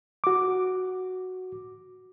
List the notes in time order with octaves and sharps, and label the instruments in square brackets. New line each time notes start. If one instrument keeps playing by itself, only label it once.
[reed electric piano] F#4 D6